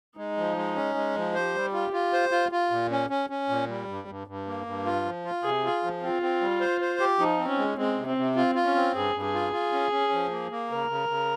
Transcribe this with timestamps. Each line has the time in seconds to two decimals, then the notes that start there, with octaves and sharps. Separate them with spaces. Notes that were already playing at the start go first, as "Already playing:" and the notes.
0.17 G#3 D#4
0.37 F3
0.57 G#3
0.76 C#4
0.95 G#3
1.16 F3
1.34 G4 C5
1.55 G3
1.73 F4
1.93 F4
2.13 C5
2.31 F4
2.52 F4
2.71 A#2
2.91 C#4
3.10 C#4
3.30 C#4
3.49 A#2
3.68 G3
3.88 G2
4.08 G2
4.27 G2
4.47 A#3
4.66 G2
4.85 F4
5.05 F3
5.25 F4
5.43 C3 G#4
5.64 F4
5.83 F3
6.02 C4 F4
6.22 C4
6.41 G3
6.61 C5
6.81 C5
7.00 G4
7.19 F3 D#4
7.38 C4
7.48 C#4
7.58 G#3
7.78 G#3 C4
7.98 C3
8.07 C4
8.17 C3
8.36 C4 F4
8.55 F4
8.65 C#4
8.75 C4
8.95 G2 G#4
9.14 G2
9.24 G#4
9.34 F4
9.53 F4
9.72 C#4
9.92 C#4
10.12 F3
10.30 A#3
10.51 A#3
10.70 C#3 A#4
10.89 C#3
11.09 C#3